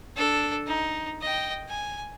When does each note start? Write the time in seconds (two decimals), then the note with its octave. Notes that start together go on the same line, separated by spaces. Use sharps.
0.16 D4 A4
0.67 D#4
1.22 D#5 G5
1.69 G#5